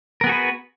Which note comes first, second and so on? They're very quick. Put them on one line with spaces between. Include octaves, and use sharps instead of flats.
A#4 B3 G#4 F#4 B4